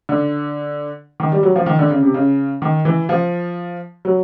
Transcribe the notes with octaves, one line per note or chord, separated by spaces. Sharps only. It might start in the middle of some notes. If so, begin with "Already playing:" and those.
D3
D#3
G3
F#3
F3
D#3
D3
C#3
C3
C#3
D#3
E3
F3
F#3